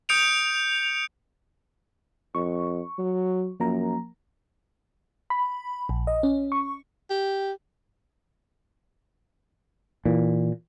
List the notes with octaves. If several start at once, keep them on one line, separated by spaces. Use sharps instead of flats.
D#6 G6 C#7 D7 F7
F2 C#6
F#3
F#2 F3 A#3 A#5
B5
A#1
D#5
C#4
C#6
G4
A#2 E3